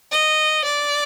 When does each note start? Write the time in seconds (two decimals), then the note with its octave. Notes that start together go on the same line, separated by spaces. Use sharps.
0.12 D#5
0.65 D5